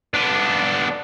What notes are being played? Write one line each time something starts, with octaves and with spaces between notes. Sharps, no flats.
B3 D4